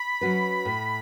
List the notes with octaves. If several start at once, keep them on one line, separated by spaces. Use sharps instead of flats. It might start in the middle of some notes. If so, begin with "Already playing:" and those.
Already playing: B5
F#3 C#4 F#4 B4
A2